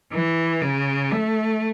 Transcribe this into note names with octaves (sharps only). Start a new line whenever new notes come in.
E3
C#3
A3